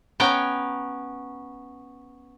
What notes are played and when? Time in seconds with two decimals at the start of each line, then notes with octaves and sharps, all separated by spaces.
0.20 B3 C#4 G5 A#5